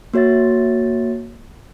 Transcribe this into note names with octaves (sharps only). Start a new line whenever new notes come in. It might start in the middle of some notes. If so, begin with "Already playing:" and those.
A#3 F#4 C#5 E5 A6